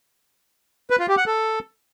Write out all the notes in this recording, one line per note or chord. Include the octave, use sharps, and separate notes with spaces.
B4
F4
G4
F#5
A4